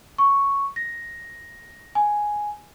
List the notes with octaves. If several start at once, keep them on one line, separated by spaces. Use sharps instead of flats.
C#6
A#6
G#5